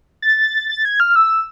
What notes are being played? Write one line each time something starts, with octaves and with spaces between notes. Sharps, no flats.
A6
A6
G#6
F6
E6